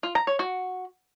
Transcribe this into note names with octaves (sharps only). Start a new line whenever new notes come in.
F4
A#5
C#5
F#4